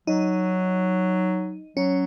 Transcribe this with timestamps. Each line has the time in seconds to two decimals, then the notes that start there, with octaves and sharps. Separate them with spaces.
0.07 F#3 D#4
1.76 F#3 C#4